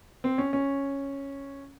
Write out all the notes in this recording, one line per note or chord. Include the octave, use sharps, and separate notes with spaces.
C4
C#4
C#4